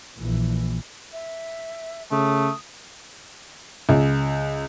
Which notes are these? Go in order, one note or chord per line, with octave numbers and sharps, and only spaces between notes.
A#1 E3
E5
C#3 A3 D#6
C#2